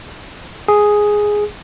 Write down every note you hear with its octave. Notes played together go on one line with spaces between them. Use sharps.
G#4